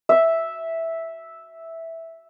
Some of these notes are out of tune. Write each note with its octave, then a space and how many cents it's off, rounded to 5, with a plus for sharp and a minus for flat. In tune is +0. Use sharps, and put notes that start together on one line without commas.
E5 -5